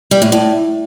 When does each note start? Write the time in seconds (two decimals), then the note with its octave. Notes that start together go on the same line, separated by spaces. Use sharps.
0.11 G3
0.22 A2
0.32 A2